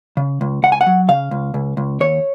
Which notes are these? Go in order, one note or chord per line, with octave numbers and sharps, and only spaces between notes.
C#3
C#2
C#2 F#5
G#5
F#5
F#3
C#3 F5
C#2
C#2
C#2
D#2 C#5